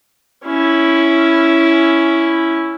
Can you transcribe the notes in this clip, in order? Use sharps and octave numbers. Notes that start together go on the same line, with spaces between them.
C#4 E4